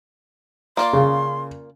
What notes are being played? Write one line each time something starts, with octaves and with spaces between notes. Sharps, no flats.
A#3 F4 D5 C6
C#3